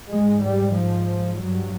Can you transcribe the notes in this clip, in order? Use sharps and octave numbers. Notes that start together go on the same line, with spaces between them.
G#2 G#3
G3
F3
G2 F#3